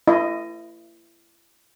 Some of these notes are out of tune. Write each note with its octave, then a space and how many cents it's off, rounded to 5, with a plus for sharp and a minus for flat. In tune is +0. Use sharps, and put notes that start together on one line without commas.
E4 +35 D#5 +0